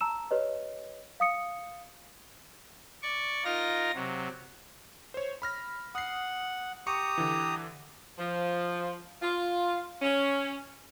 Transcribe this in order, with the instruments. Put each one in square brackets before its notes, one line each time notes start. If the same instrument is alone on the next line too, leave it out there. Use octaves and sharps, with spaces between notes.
[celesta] A5 A#5 E6 E7
G4 B4 C#5 D#5
F5 D#6 C#7
[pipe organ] D5 C#6
D#4 F4 A#4 A#6
C3 F#3
[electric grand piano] C5 C#5
B5 F6 A#6
[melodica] F#5 [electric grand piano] D#6 C7
[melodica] G4 A#5 D#6 [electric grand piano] C#6 C#7
[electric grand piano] D3 E3
[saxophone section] F3
F4
C#4